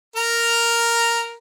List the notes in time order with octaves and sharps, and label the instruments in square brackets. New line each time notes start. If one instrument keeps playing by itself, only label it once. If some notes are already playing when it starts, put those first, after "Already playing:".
[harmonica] A#4 A#5